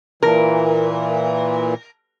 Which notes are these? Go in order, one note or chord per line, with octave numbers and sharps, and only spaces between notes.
A#2 E3 A#4